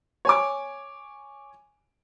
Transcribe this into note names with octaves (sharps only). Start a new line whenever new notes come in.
C#5 G#5 D6